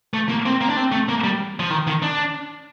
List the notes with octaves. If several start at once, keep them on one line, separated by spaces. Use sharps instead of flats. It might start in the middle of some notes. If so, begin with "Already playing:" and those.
A3
A#3
C4
A#3
D4
C4
A3
A#3
G3
F3
D#3
D#3
D4